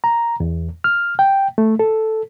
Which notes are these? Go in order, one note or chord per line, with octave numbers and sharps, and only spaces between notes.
A#5
E2
F6
G5
A3
A4